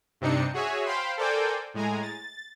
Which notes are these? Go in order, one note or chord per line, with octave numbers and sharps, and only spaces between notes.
G2 C3 C4 D4 D#4 C#7
F#4 G#4 C#5 E5 G#5
C5 F5 G5 B5 C6
A4 A#4 C5 D5 G5 G#5
A2 G#3 G#5 A#5
A6